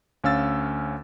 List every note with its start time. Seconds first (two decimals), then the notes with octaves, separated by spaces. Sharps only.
0.24 D2 C#4 F5 E6 A6